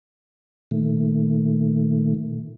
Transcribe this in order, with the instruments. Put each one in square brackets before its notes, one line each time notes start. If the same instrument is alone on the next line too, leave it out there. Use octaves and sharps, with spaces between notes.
[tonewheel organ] A#2 D#3 A3